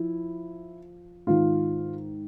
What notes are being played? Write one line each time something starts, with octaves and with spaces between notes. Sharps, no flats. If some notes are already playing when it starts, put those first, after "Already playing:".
Already playing: F3 E4
G#2 D#3 F4